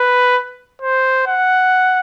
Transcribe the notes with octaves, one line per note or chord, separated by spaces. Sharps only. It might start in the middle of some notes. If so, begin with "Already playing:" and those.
Already playing: B4
C5
F#5